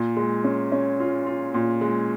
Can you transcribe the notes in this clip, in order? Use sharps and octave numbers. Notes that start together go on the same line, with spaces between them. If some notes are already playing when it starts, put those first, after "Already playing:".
Already playing: A#2
G#3
C#4
C#4
F4
F4
A#2
G#3